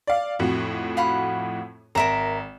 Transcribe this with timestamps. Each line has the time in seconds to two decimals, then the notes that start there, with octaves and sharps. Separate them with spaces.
0.07 D5 F5
0.39 F2 A2 F#4
0.97 F5 F#5 B5
1.95 G#1 A#4 E5 A#5